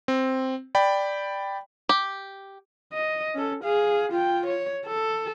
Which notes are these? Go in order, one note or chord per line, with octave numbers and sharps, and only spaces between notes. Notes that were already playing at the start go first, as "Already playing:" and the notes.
C4
D5 G5 B5
G4
D#5
C#4 A4
G#4 F5
F4 G5
C#5
A4